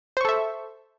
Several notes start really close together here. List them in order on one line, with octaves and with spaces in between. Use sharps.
C5 C#6 A4 E5